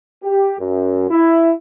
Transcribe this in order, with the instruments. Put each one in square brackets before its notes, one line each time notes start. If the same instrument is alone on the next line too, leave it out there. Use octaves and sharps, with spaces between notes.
[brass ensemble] G4
F#2
E4